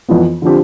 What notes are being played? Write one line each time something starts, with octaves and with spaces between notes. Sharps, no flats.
F2 E3 B3 F4
D3 F3 C4 G4